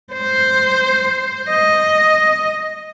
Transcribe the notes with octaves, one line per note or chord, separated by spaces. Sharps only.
C5
D#5